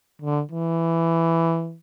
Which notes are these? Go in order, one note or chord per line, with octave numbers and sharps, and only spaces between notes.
D3
E3